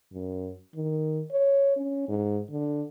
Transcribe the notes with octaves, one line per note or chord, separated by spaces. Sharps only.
F#2
D#3
C#5
C#4
G#2
D3